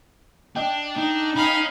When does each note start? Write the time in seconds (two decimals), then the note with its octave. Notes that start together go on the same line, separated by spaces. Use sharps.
0.56 D4 D#5 G5
0.97 D4 D#4
1.36 C#4 F5 B5